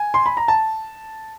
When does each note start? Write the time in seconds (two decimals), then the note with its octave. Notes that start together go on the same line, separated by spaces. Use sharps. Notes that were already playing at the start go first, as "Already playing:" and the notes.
Already playing: G#5
0.14 C6
0.26 B5
0.37 A#5
0.48 A5